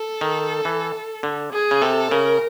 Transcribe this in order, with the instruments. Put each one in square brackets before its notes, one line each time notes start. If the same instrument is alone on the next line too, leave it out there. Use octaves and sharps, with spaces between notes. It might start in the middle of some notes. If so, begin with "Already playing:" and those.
Already playing: [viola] A4
[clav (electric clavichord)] D#3
E3
D3
[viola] G#4
[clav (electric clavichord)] C#3
[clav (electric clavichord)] C3 [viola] A4
[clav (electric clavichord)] C#3 [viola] A#4